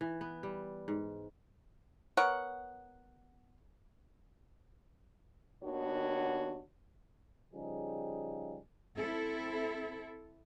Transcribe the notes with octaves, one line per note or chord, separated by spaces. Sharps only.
E3
B3
G3
G#2
B3 A#4 C#5 F#5
D#2 D#3 B3 D4 F#4 C#5
C#3 F3 G3 D#4 G4 G#4
C4 E4 A4